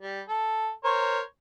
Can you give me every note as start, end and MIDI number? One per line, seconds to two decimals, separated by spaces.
0.01 0.21 55
0.28 0.69 69
0.84 1.20 70
0.84 1.20 72
0.84 1.20 73